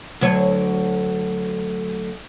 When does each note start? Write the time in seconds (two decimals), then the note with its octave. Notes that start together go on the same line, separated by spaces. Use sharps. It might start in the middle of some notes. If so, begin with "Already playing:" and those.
0.21 D2 F#3 C#5